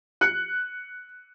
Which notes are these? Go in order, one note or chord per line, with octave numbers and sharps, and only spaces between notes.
F#6 C#7